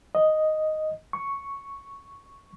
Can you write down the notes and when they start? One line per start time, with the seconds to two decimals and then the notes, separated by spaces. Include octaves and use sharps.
0.15 D#5
1.13 C#6